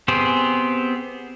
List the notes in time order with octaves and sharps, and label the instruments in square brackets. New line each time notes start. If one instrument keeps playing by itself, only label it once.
[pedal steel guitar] B3 C4 G4 G#4 C5